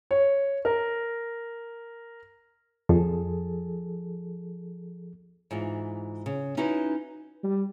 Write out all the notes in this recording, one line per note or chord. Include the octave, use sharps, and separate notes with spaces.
C#5
A#4
F2 F3 G#4 A4
G#2 E3 F4
C#3
C#4 D#4 E4 F#4 B4
G3